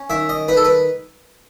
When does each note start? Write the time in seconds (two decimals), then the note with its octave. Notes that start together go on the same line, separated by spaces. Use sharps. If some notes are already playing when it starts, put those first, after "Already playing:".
Already playing: C#4
0.10 D#3 E5
0.29 D#5
0.48 D#4 B4
0.57 A4
0.64 B4